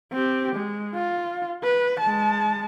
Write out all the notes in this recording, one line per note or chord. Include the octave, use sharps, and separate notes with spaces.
C4 G4
G#3
F4
B4
G#3 A5